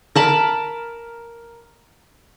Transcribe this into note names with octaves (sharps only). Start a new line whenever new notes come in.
A#4 A5 B5